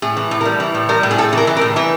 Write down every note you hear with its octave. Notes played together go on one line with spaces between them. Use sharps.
A2 G#4
E3
A2
A#4
G3
E3
A2
G3 A#4
A2
G#4
A2 A4
E3 A#4
E3
A#4
A2
E3 B4